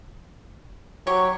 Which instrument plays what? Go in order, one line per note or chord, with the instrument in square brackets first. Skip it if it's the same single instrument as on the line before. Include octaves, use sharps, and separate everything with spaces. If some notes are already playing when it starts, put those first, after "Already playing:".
[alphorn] F#3 [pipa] G4 C#5